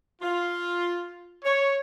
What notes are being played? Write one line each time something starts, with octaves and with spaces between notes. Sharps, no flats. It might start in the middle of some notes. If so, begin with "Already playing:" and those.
F4
C#5